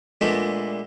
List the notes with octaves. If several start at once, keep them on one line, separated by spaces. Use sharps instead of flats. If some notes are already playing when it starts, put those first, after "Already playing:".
A#2 G#3 A3 B3 D4